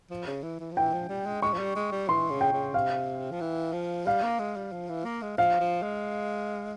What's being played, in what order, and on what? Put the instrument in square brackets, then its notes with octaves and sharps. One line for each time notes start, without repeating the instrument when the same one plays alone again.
[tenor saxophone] F3
C#3
E3
E3
F3
[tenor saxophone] E3 [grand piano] G5
[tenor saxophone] F3
G3
G#3
[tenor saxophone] G#3 [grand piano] C#6
[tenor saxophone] F3
G3
G#3
G3
[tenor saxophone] E3 [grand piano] C6
[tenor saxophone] C#3
[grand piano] G5
[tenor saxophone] C#3
[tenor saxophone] C3 [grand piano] F5
[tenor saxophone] F3
E3
F3
[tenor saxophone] G3 [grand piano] F5
[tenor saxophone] A#3
G#3
G3
F3
E3
A#3
G#3
[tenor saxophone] F3 [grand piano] F5
[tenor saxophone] F3
G#3